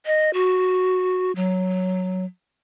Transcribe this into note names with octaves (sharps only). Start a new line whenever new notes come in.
D#5
F#4
F#3